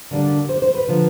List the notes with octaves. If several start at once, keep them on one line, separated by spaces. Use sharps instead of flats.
D3 G3 A#3 D4
C5
C5
B4
D3 F3 A#3